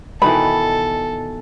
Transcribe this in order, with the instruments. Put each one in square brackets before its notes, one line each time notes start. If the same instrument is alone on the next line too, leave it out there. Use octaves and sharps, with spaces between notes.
[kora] B2 D#3 E3 [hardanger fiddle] A4 [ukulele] B5